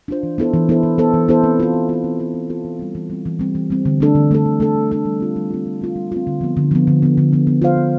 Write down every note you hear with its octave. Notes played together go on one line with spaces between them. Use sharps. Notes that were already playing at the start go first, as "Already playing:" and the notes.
D4 F4 C5
E3
B3 E4 A4 C5
E3
B3 E4 A4 C5
E3
B3 E4 A4 C5
E3
B3 E4 A4 C5
C4
F4 A4
C4
F4 A4
C4
F4 A4
C4
F4 A4
E3
G3 C4
E3
G3 C4
E3
G3 C4
E3
G3 C4
D3
A3 D4 A4
D3
A3 D4 A4
D3
A3 D4 A4
D3
A3 D4 A4
G3
C4 F4
G3
C4 F4
G3
C4 F4
G3
C4 F4
D3
F3 B3
D3
F3 B3
D3
F3 B3
D3
F3 B3
B3
F4 C5 F5
B3